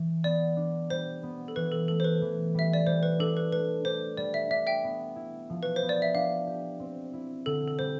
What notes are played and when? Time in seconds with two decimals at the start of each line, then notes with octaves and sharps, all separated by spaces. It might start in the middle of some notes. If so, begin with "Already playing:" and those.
Already playing: E3
0.24 B3 D5
0.57 D4
0.90 G3 C5
1.23 B3
1.48 A4
1.56 E3 B4
1.72 A4
1.88 A3 A4
2.00 C5
2.04 B4
2.22 E3
2.55 G3 E5
2.73 D5
2.86 G3 C5
3.03 B4
3.19 D4 A4
3.37 B4
3.52 A3 B4
3.85 D4 C5
4.17 G3 D5
4.34 E5
4.50 D4 E5
4.67 E5 G5
4.84 B3
5.16 E4
5.50 F3
5.63 B4
5.76 C5
5.82 B3
5.89 D5
6.02 E5
6.14 D4 F5
6.47 G4
6.80 C4
7.13 E4
7.46 D3 A4
7.68 A4
7.79 G3 C5